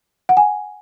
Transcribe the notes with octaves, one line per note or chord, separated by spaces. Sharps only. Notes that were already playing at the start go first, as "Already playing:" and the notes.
F#5
G#5